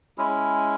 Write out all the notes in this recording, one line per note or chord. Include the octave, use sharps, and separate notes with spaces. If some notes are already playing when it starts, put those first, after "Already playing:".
G#3 C#4 E4